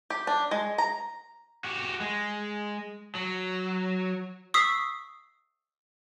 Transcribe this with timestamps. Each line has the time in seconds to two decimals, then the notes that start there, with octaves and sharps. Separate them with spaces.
0.10 G4
0.27 D4
0.51 G#3
0.78 A#5
1.64 F#4 G4
2.01 G#3
3.15 F#3
4.54 C#6 D#6 E6 B6 C7